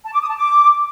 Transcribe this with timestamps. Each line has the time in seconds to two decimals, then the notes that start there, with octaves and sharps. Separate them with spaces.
0.05 A5
0.13 D6
0.21 D#6
0.29 A5
0.37 D6